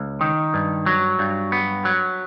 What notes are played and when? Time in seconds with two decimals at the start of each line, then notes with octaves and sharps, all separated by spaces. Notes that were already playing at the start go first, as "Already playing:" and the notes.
Already playing: C#2
0.21 D#3
0.54 G2
0.86 F#3
1.19 G2
1.52 B3
1.85 F#3